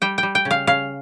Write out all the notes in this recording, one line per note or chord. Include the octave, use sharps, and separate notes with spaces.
G3 G5
G3 G5
G5
C#3
F5
C#3 F5